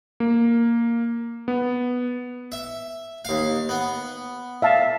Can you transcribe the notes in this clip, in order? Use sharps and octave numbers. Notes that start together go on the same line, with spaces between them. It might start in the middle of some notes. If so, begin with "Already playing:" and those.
A#3
B3
E5
D#2 F5
B3
E5 F5 A5